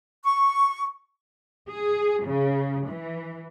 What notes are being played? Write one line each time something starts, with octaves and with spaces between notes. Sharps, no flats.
C#6
G#4
C#3
E3